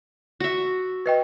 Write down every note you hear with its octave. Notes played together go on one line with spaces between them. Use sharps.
F#4 E5
B4 D#5 G5